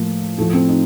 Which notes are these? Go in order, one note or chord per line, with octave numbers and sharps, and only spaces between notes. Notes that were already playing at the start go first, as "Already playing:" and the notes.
Already playing: A2 F3 A#3
A2 F3 A3
C4
D#4